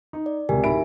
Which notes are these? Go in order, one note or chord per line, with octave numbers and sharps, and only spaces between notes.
D#4
D5
C#2 C3 G4 A#4 G#5
D1 D#4 E5 B5 D7